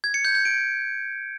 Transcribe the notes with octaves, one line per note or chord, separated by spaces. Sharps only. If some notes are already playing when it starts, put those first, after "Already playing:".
G#6
C#7
G6
G6
D7